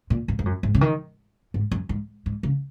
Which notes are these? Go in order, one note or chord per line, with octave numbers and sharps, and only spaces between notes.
A#2
G#2
G#2
F#2
G#2
C#3
D#3
G#2
F#2
G#2
G#2
C#3